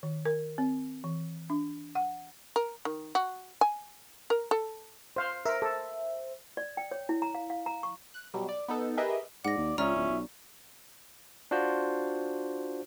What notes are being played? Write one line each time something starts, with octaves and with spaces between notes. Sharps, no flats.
D#3
A#4
C4
E3
D4
F#5
A#4
D#3
F#4
G#5
A#4
A4
C5 F5
A#4 C5 E5
A4
D5
G5
C#5
E4
A#5
F5
F5
A#5
C#6
F#6
B2 F#3 G3
D5
B3 D#4 A4
G4 G#4 A#4 B4 D#5 E5
G#2 D5 F#5 A#6
D#2
C#2 C#4 F4 D5 E5 A#5 D#6 F6
D1
B1
D4 F4 F#4 C5